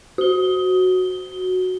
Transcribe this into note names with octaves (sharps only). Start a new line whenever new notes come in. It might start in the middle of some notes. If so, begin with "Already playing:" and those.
F#4 G7